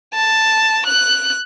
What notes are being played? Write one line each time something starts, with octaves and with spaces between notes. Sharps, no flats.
A5
F#6